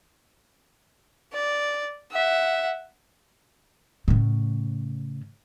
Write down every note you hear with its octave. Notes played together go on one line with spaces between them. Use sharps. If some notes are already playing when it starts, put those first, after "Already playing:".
D5
E5 F#5
A2 C#3